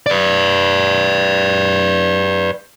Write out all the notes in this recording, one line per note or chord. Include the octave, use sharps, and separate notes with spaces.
B4 D5